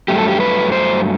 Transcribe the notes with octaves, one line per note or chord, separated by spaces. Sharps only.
G2 F#3 A3 G4
A4
G4
B4
C5